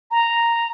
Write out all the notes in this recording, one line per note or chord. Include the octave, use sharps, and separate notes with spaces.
A#5